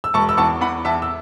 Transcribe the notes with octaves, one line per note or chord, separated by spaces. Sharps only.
E6
E1 A5 C#6
E6
E2 A5 C#6
E2 F#5 B5
E2 E5 A5
E6